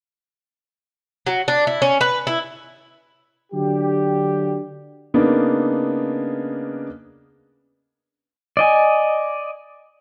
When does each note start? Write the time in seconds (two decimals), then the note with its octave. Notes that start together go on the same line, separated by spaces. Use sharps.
1.27 F#3
1.48 D4
1.67 E4
1.82 C#4
2.01 B4
2.27 E4
3.52 D3 F#3 D4 F#4 G4
5.14 C#3 A#3 B3 D4 D#4
8.57 D5 D#5 G#5